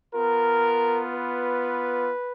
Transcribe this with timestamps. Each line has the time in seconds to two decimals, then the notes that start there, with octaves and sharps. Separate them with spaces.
0.14 B3 F4 A#4
1.13 B4